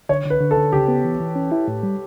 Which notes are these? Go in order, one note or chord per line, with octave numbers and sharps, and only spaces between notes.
D3 C#5
D3 B4
D3
A4
D3
C#3 G4
B3
E3
E3
C#4
E4
A2
G3